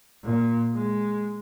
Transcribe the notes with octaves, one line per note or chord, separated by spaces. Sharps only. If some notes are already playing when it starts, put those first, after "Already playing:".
A#2
G#3